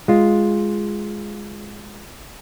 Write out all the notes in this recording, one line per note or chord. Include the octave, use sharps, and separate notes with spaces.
G#3 F4